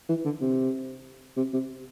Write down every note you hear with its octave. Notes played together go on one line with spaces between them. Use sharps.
E3
D3
C3
C3
C3